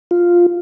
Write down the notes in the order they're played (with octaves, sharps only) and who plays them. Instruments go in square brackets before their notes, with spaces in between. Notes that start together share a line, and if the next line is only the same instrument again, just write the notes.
[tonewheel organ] F4